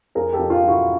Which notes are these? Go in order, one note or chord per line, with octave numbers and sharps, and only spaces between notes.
F2 G#4 A#4
G4 A4
F2
F4 G4
F3
E4 F#4